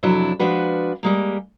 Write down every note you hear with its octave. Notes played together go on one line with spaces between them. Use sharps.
F2 C3 F#3 D4 E4
F3 G#3 D4 F#4 B4
G3 G#3 A#3